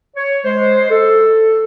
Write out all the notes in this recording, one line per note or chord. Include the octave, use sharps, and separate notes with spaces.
C#5
G#3 C5
A4